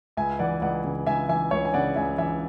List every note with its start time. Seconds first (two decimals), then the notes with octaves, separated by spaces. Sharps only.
0.17 C#2 E5 G#5
0.39 E3 D5 F#5
0.61 C#2 D5 F#5
0.84 C#3
1.07 C#2 E5 G#5
1.29 E3 E5 G#5
1.51 C#2 C#5 E5
1.65 G#5
1.74 C#3 D5 F#5
1.96 C#2 E5 G#5
2.18 E3 E5 G#5